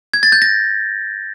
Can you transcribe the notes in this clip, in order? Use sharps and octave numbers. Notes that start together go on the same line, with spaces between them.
G#6
A6
G6
A#6